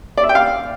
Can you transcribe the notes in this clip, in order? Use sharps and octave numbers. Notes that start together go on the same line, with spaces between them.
D5
E5
G5
F5